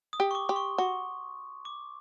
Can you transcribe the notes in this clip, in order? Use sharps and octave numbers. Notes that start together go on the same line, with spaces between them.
D#6
G4
C#6
D6
G4 C6
C#6
F#4 C#6
D6